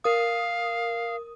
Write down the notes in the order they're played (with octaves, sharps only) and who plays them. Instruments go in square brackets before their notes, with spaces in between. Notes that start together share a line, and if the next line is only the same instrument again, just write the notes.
[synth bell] A#4 D#6 [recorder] F5